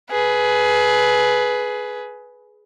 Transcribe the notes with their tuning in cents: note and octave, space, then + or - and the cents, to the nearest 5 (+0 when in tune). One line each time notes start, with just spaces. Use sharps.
G#4 +20 B4 +0